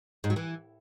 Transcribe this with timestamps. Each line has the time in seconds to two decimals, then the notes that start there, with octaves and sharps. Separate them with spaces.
0.24 G#2
0.30 F#3
0.36 E3